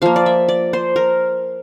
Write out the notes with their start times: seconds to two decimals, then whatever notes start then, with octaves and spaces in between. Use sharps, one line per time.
0.02 F3 A#3 F5
0.16 D5
0.26 E5
0.49 D5
0.73 C5
0.96 A#4